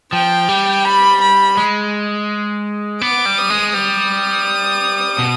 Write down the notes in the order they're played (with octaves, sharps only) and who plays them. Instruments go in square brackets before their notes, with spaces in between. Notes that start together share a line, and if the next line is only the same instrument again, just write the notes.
[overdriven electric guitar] F3 [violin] G5
[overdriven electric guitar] G3
[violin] B5
B5
[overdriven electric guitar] G#3
[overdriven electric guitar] B3 [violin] D6
[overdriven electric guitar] G3
[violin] D#6
[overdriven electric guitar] G#3
[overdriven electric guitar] G3 [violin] D#6
[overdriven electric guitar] B2